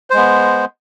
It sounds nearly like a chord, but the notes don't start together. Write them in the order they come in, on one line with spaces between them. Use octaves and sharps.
C5 G#3 B3